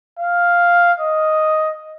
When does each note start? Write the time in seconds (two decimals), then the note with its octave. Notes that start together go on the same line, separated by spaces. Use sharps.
0.19 F5
1.00 D#5